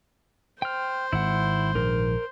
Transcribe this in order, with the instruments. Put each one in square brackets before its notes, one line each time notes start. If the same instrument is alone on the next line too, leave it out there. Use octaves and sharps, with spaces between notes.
[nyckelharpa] C5 [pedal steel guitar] G5 F6
[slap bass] G#1 [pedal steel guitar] E4 F#5
[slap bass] A#1 G#2 D#3 [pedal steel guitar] A#4